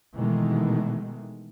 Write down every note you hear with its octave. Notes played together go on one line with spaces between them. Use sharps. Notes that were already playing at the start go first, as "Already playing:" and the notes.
B2 D#3 E3 G#3 A3